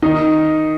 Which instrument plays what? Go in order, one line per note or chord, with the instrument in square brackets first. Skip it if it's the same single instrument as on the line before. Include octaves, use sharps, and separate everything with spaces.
[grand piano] D#3 D#4